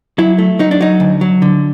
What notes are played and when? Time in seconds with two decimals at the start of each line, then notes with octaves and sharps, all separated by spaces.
0.18 F#3 E4
0.38 A3
0.59 F#3 D#4
0.71 D4
0.81 F#3 D#4
1.00 D2
1.21 F#3
1.42 D3